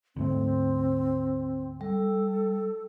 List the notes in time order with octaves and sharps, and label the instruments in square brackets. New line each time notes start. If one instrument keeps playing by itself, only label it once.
[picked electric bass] D2 G#2 A3 [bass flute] C4
[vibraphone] G3 [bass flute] A4